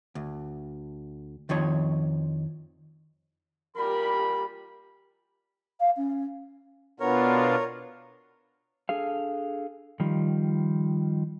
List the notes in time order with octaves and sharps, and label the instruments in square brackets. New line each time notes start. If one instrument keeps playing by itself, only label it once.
[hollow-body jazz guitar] D2
F2 D#3 F3 C#5
[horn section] A#2 G3 B5 [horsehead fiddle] G4 A#4
[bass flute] F5
C#4
[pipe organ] B2 D4 F4 [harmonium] B3 [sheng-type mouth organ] A#4 C#5
[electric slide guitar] D4 G#4 A4 F5
D#3 F3 G3